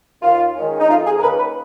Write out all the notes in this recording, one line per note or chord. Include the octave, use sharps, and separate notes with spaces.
D#2 F4
D#3 G#3 C#4
D#4
F2 F4
G#4
A#4
D#3 A#3 C#4 B4
B4